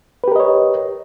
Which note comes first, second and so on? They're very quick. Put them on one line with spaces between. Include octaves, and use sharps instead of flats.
B4 G4 A#4 D#5 C#5